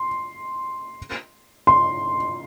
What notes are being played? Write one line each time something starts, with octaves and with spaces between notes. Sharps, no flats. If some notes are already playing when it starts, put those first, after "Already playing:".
Already playing: C6
C6